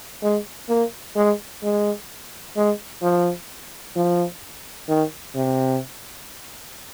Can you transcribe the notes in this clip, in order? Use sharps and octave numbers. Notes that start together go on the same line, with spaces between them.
G#3
A#3
G#3
G#3
G#3
F3
F3
D#3
C3